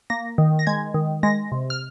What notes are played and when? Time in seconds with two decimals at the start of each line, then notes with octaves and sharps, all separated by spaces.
0.10 A#3 A#6
0.38 D#3
0.59 A#6
0.67 G#3 G#6
0.94 D#3
1.23 G#3 A#6
1.52 C3
1.70 F6